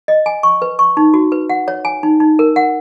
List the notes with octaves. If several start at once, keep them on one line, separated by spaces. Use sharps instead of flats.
D#5
G#5
C#6
B4
C#6
D#4
F#4
B4
F#5
C#5
G#5
D#4
D#4
A#4
F#5